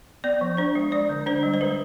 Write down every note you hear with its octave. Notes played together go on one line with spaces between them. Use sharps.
B3 D5
F3
D4 C5
G#3
G#3 D5
D3
D4 C5
G3
C5
G#3 B4